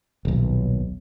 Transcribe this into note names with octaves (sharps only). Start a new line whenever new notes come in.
D#1 B1